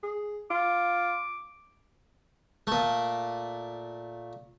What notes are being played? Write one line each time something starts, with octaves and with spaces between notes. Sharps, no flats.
G#4
F4 D6
A#2 A3